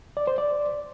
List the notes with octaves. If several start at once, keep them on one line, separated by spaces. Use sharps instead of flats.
D5
C5
D5